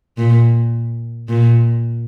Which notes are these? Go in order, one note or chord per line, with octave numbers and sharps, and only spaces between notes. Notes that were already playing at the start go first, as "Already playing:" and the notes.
A#2
A#2